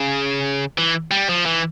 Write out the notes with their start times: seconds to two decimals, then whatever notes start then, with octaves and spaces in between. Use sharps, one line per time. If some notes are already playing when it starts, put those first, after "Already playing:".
Already playing: C#3
0.78 E3
1.11 G3
1.29 F3
1.46 E3